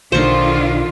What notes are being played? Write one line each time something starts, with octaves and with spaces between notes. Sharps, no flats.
B1 D3 D#3 F4 C5 C#6